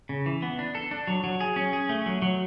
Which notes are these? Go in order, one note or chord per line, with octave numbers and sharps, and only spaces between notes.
C#3
E3
B3
D4
A4
D4
F#3
F#3
G#4
C#4
G#4
A3
F#3
F#3